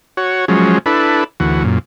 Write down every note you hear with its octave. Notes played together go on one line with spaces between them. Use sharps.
F#4 C#5
F3 F#3 G#3 C#4
D4 E4 A4 B4
D2 E3 F#4
F#2 A#2